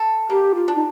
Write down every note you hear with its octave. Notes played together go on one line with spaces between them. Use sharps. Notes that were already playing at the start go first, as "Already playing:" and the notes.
Already playing: A4
A#3 G4
F4
D4
D#4